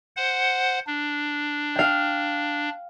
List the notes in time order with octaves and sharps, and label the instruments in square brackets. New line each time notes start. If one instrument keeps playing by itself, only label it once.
[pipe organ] C5 F#5
D4
[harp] F5 G5